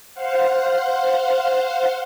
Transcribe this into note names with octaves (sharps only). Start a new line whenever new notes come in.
C5 F5 F#5